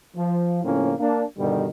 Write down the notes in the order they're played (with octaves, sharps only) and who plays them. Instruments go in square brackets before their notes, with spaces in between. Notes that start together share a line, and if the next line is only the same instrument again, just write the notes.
[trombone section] F3
A2 C#3 F3 A#3 C4 C#4
A#3 D4
G2 B2 D3 D#3 G3